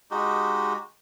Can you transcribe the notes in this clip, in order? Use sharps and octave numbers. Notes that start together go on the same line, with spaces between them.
G#3 D#4 F#4 G4